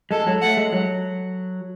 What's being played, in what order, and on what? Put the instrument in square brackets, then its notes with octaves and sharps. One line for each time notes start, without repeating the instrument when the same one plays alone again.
[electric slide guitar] G#3 [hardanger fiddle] A4
[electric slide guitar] F#3
[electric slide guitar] A3 [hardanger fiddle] F#5
[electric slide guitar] G#3
F#3